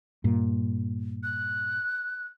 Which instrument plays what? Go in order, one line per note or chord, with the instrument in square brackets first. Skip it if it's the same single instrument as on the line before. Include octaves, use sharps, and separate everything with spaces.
[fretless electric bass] G2 A#2
[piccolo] F#6